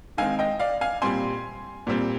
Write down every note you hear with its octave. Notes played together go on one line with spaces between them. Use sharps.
D#3 G#3 C4 F5 G#5
D#5 G5
D5 F5
F5 G#5
A#2 G3 C4 G#5 C6
A#2 G3 C4